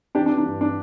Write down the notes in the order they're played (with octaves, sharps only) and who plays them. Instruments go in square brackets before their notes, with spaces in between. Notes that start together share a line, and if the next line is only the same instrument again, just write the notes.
[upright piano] E3 D4 G4
D4
E3
D4
G2
D4